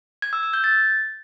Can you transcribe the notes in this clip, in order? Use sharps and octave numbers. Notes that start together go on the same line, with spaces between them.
G#6
E6
E6
G6
A6